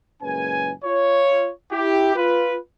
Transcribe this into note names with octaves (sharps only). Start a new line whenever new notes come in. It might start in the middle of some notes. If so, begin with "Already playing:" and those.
F#1 A#2 G#3 C#4 B4 G#5
F4 C#5
E4 G4
F4 B4